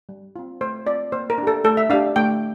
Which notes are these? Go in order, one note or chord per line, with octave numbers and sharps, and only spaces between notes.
G3
C4 F4
A3 C5
C4 F4 D5
A#3 C5
A#4
D4
G4 A4
A3 A4
E5
D4 G4 F5
A3 G5